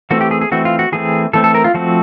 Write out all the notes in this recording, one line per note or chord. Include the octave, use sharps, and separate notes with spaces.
E3 A3 C4 F#4
G4
G#4
G#4
E3 A3 C4 F#4
F4
F#4
E3 A3 C4 G#4
E3 A3 C4 A4
A4
A#4
F4
F3 A3 C4 F#4